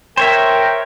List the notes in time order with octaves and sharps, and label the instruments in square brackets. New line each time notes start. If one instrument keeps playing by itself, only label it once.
[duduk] A#4 [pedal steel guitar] C5 C#5 E5 [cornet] G5